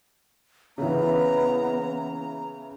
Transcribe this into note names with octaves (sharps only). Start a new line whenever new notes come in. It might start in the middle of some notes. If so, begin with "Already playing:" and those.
C#3 E3 B3 A#5